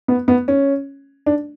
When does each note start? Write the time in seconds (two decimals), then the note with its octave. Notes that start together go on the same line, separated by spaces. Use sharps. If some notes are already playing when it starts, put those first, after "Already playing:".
0.08 B3
0.28 B3
0.48 C#4
1.26 D4